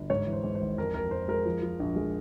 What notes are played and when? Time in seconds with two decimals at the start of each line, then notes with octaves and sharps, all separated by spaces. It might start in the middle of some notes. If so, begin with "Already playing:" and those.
Already playing: G1
0.10 G#2 C#5
0.27 E3
0.33 C5
0.44 G#2
0.55 C5
0.61 G#1
0.77 F2 A#4
0.94 F2 A#4
1.11 F2 C5
1.28 G#3 A#4
1.45 F3
1.62 F3
1.80 A#1
1.96 G#3